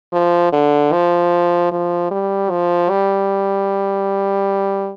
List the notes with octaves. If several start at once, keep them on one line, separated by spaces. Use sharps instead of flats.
F3
D3
F3
F3
G3
F3
G3